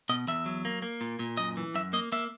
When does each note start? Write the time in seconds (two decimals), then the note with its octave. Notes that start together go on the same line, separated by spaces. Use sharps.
0.09 B2 D#5
0.27 E2 E5
0.46 F#3
0.65 A#3
0.82 A#3
1.01 A#2
1.19 A#2
1.37 F#2 D#5
1.57 E3
1.74 F#2 E5
1.93 A#3 D#5
2.12 A#3 E5